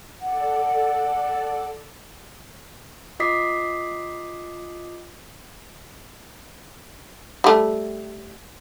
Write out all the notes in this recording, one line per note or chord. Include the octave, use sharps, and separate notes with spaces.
A4 D5 F#5
F4 D#5 D6 D#6 B6 C7
G3 A3